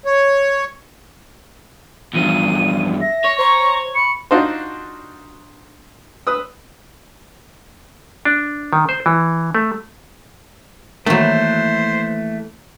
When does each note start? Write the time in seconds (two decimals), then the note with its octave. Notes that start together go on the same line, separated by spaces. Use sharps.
0.05 C#5
2.14 E2 G2 F3 D#7
3.01 E5 A#6
3.24 C#5 C#6
3.39 C5 A#5 C#6
3.95 B5 C#6 C#7
4.31 D4 D#4 F4 F#4 C5
6.27 B4 D#6 E6
8.25 D4
8.73 D#3
8.89 C5
9.06 E3
9.55 A3
11.06 D#3 E3 F#3 A3 A#3 C5